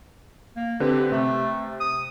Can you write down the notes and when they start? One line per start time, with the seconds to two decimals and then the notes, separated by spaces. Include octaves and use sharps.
0.56 A#3
0.80 D3 C4 G4 B4
1.12 C3 A3
1.80 D#6